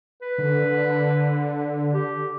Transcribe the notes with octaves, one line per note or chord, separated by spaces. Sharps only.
B4
D3
G4